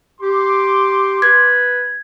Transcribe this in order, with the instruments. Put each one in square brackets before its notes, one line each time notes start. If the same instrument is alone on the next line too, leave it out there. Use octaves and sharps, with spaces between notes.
[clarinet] G4 [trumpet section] C6 D6
[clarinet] B4 [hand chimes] G#6